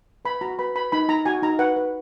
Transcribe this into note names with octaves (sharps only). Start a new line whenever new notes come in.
B4 B5
F#4 A#5
B4 B5
B4 B5
D#4 B5
D#4 A#5
F#4 G#5
D#4 A#5
B4 F#5
B4